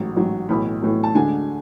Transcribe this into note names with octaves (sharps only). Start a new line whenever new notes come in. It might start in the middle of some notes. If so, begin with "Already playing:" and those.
Already playing: A1 G#2 F#3
A1 G#2 F#3
B1 A2 E3 B5
B1 A2 E3
A5
D2 D3 G#3 D4 G#5